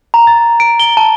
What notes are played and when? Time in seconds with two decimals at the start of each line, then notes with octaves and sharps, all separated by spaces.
0.14 A#5
0.27 A6
0.60 D7
0.80 G7
0.97 A5